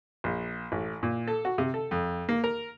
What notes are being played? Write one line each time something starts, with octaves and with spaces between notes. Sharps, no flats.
A#1
A1
A#2
A4
F#4
C3
A4
F2
A#3
A#4